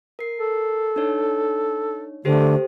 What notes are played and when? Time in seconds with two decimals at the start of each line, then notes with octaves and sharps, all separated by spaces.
0.19 A#4 C7
0.39 A4
0.96 D4 D#4 C#5
2.25 D3 A3 G4 A4 C5